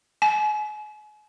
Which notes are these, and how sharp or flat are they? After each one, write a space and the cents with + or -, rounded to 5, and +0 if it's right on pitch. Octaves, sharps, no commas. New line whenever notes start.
G#5 +35